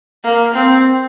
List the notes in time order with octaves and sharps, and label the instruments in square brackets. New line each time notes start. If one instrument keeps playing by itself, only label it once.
[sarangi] A#3
C4